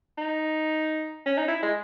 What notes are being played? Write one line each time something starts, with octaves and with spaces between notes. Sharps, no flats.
D#4
C#4
D#4
E4
G#3